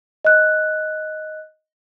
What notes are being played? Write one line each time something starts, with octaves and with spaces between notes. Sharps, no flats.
D#5 F#6